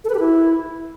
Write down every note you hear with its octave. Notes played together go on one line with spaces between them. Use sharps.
A4
B4
G4
E4